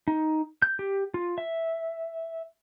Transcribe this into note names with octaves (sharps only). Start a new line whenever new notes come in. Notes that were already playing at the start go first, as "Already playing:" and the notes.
D#4
G6
G4
F4
E5